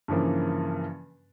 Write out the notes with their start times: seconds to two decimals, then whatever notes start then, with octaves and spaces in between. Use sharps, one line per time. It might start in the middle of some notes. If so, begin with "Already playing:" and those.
0.08 G2 C#3 E3 F3 A#3